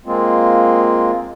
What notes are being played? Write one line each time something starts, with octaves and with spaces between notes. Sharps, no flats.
G#3 A#3 C4 F4